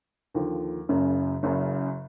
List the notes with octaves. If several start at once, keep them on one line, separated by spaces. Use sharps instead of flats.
D#2 D3 F3
F#1 F#2 C#3
F#1 F#2 C#3